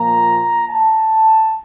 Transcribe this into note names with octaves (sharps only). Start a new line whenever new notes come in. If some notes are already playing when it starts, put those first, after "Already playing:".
Already playing: A#2 F3 A#3 A#5
A5